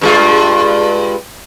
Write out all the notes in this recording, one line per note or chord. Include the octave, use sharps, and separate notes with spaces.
G2 G#3 F4